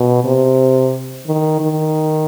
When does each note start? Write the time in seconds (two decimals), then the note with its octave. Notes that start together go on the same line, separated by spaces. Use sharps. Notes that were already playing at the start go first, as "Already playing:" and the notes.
Already playing: B2
0.24 C3
1.27 D#3
1.60 D#3